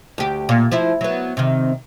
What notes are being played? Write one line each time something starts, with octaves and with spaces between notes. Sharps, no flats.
D2 G4
A#2
F3 E4
F#3 B3
C3 D#3